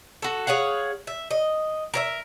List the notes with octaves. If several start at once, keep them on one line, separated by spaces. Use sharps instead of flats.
F#4 A4
G#4 C#5 F5 F#5
E5
D#5
A#4 C#5 E5